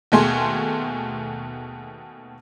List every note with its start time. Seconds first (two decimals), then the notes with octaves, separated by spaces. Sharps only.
0.12 D#2 B2 A3 G#4 C6